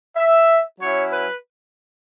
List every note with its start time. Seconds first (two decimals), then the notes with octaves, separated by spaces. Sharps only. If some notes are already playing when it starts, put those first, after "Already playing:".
0.16 E5
0.80 F#3 C#4 E4 C#5
1.13 B4